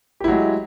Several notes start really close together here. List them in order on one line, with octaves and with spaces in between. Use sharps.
G4 E4 F#3 G#3